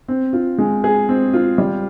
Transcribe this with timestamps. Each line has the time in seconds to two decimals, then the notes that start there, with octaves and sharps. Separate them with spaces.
0.08 C4
0.33 F4
0.58 G#3
0.84 G#4
1.09 C4
1.33 F4
1.58 G3